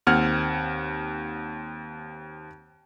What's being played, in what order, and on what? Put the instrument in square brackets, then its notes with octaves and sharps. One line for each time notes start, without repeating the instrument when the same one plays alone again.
[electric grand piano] D#2 C4 F#5 F6 G#6